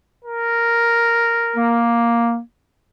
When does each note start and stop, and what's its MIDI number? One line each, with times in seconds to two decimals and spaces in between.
0.25 1.85 70
1.56 2.39 58